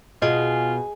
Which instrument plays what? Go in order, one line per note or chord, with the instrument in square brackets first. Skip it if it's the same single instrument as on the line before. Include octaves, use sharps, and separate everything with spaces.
[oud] B2 [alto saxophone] F4 [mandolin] G#4 [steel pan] D#5